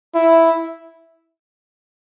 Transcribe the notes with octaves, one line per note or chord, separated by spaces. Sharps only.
E4